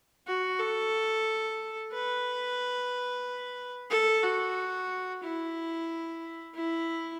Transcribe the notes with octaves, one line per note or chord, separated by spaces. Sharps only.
F#4
A4
B4
A4
F#4
E4
E4